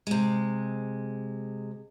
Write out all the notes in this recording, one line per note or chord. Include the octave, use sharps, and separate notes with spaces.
C3 G#3